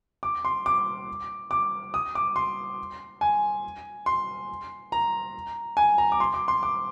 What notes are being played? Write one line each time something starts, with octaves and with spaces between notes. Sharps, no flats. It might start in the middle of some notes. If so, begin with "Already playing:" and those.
D6
C6
D6
D6
D#6
D6
C6
G#5
C6
A#5
G#5
A#5
D6
C6
D6
C6
D6